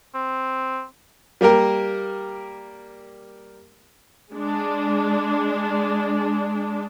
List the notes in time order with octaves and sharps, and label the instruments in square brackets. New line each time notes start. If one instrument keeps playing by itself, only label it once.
[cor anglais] C4
[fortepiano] G3 A#3 G4 A#4
[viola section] G#3 D4